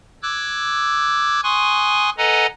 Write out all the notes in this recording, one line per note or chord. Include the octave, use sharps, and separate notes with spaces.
D6 E6 F#6 G#6
G#5 C6 C#6 D#6 F#6
A4 B4 D#5 F#5 G#5 A#5